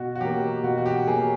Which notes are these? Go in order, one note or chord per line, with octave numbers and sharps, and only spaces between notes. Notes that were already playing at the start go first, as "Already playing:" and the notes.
Already playing: B2 F#4
F#4
F#3 A#3 G4
B2 F#4
F#4
G4
F#3 A#3 G#4